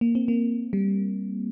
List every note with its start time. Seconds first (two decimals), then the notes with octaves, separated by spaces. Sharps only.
0.01 A#3
0.15 C4
0.28 A#3
0.73 G3